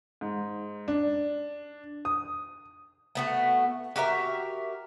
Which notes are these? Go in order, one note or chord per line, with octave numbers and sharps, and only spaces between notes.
G#2
D4
D#6
A3 B3 F#4
F#4 G4 A#4 E5